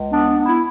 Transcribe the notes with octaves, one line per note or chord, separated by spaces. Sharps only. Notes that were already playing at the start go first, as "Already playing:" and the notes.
Already playing: C#2
B3 D4
D4
B3
E4